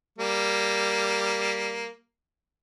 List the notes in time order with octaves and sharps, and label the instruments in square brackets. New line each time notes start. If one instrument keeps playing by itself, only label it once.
[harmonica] G3 A#3